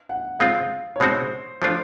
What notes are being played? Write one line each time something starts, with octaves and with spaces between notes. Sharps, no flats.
F#5
G#3 C4 F4 F5
C#5
B2 G#3 C4 D#4 F#4 C5
F3 A3 D4 F4 C5